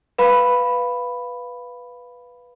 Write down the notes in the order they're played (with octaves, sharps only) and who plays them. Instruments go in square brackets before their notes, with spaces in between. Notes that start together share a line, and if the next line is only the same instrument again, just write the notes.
[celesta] B4 F5 B5